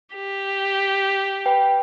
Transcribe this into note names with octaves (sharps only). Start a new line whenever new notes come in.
G4
B4 G5